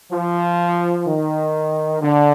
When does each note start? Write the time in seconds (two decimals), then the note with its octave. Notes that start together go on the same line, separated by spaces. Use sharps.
0.11 F3
1.06 D#3
2.02 D3